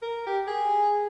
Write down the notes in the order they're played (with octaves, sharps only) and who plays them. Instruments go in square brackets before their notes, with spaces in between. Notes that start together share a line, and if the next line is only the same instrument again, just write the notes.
[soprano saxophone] A#4
G4
G#4